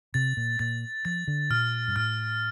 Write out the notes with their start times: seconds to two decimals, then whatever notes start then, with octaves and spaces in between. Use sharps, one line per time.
0.14 C3 A6
0.37 A#2
0.59 A#2 A6
1.05 F3 A6
1.27 D3
1.50 A#2 F6
1.88 G2
1.96 A2 F6